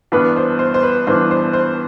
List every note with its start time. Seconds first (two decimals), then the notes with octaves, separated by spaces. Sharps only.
0.12 G1 G2 E3 B3 D4 B4
0.36 C5
0.59 C5
0.74 C5
0.83 B4
1.07 G1 G2 E3 B3 D4 C5
1.31 C5
1.53 C5